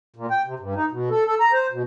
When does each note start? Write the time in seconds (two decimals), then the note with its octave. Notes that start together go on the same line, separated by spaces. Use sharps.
0.16 A#2
0.31 G5
0.46 C3
0.59 G2
0.75 D#4
0.91 B2
1.10 A4
1.25 A4
1.40 A#5
1.53 C5
1.72 B2